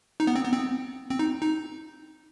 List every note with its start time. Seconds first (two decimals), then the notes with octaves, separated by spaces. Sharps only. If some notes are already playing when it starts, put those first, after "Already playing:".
0.20 D#4
0.27 B3
0.36 C4
0.44 B3
0.53 C4
1.10 C4
1.19 D#4
1.41 D#4